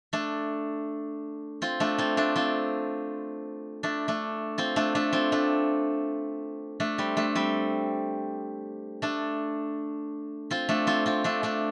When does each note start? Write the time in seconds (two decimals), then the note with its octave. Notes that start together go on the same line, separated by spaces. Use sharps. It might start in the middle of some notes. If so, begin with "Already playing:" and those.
0.13 A3 D4
1.62 C4 F4
1.80 A3 D4
1.98 C4 F4
2.17 A3 D4
2.36 C4 F4
3.83 A3 D4
4.08 A3 D4
4.58 C4 F4
4.76 A3 D4
4.95 A3 D4
5.13 C4 F4
5.32 A3 D4
6.80 A3 D4
6.98 G3 C4
7.17 A3 D4
7.35 G3 C4
9.02 A3 D4
10.51 C4 F4
10.69 A3 D4
10.87 C4 F4
11.06 C4 F4
11.24 A3 D4
11.43 A3 D4